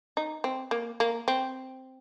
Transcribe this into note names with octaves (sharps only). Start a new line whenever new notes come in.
D#4
C4
A#3
A#3
C4